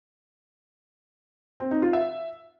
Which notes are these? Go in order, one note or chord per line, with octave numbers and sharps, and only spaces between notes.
C4
D#4
F4
E5